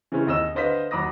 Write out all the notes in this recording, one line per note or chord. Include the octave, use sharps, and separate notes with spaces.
C#3 E3 G#3 C4 C#4
D#2 D#5 E6 E7
D3 B4 C5 D#5 F5 B6
D#2 F#3 B5 D6 D#6 A#6